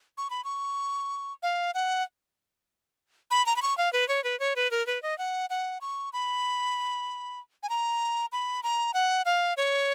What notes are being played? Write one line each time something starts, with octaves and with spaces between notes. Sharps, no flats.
C#6
B5
C#6
F5
F#5
B5
A#5
B5
C#6
F5
B4
C#5
B4
C#5
B4
A#4
B4
D#5
F#5
F#5
C#6
B5
G#5
A#5
B5
A#5
F#5
F5
C#5